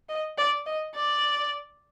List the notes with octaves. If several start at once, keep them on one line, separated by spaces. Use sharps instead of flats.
D#5
D5
D#5
D5